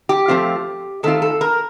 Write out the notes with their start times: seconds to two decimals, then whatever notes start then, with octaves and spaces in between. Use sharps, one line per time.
0.09 G4
0.28 F3 A3 C4 F4
1.03 D#3 A3 C4 F4 A4
1.22 A4
1.41 A#4